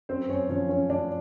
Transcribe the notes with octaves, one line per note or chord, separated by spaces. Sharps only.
F#2 C4 C5
F#2 C#4 C#5
F3 C#4 C#5
F#2 C#4 C#5
F3 D4 D5